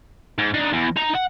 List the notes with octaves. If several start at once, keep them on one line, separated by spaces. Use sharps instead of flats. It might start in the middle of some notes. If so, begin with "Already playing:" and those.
G#2
D4 D#4
E2
D#4 A#5
F#5